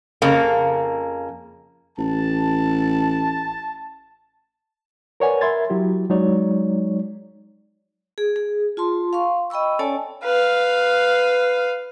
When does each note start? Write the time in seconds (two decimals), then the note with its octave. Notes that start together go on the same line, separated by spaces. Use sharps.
0.22 F2 C#3 A#3
1.98 A1 A5
5.20 A#4 B4 C#5 D5 F#5 G#5
5.41 A#4 E5 B5 C6 G#6 A6
5.70 F#3 E4 G4
6.10 F#3 G#3 D#4 C#5 D5
8.18 G#4
8.36 G#4
8.77 F4 A5 C6
9.13 F5 C6 C#6
9.50 D#5 G5 B5 C#6 E6
9.79 C#4 A4 C#5 D5 G#5 A5
10.23 B4 F5